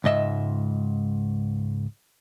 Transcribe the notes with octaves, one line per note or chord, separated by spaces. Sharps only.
C#2 G#2 D#5 E5